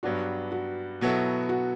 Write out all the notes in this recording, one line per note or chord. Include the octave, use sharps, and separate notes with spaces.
G2 F#3 B3 D4 F#4
F#4
B2 F#3 B3 E4 A4
F#4